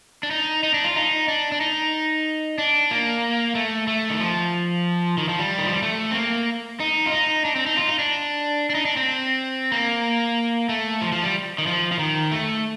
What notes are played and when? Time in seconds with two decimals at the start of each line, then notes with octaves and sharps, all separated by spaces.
0.23 D4
0.31 D#4
0.63 D#4
0.74 D4
0.85 F4
0.96 D#4
1.28 D4
1.52 D4
1.61 D#4
2.58 D4
2.91 A#3
3.55 A3
3.87 A3
4.10 D#3
4.20 F3
5.18 D#3
5.29 F3
5.39 G3
5.58 D#3
5.67 F3
5.74 G3
5.83 A3
6.11 C4
6.15 A#3
6.80 D#4
7.06 F4
7.12 D#4
7.45 D4
7.55 C4
7.66 D#4
7.77 F4
7.88 D#4
7.99 D4
8.70 D4
8.75 D#4
8.85 D4
8.97 C4
9.72 A#3
10.69 A3
11.02 F3
11.12 F3
11.23 G3
11.58 D#3
11.67 F3
11.92 F3
11.99 D#3
12.32 A3